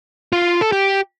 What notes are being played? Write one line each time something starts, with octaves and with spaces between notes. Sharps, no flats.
F4
A4
G4